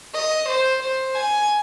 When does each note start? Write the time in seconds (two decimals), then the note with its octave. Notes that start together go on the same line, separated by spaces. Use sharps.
0.14 D#5
0.48 C5
0.83 C5
1.15 G#5